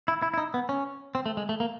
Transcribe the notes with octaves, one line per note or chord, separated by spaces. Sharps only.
E4
E4
E4
D#4
B3
C#4
C4
A3
G#3
A3
A#3